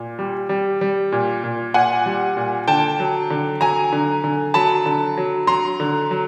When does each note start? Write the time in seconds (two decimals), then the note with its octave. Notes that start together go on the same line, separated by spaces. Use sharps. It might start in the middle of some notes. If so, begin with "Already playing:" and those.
Already playing: A#2
0.19 G3
0.49 G3
0.81 G3
1.12 A#2
1.44 A#2
1.74 A#2 F#5 G#5
2.06 G3
2.37 A#2
2.68 D3 G5 A5
3.00 F#3
3.30 D3
3.61 F#3 G#5 A#5
3.92 D3
4.24 D3
4.54 F#3 A5 B5
4.86 D3
5.17 F#3
5.47 F#3 A#5 C6
5.80 D3
6.11 F#3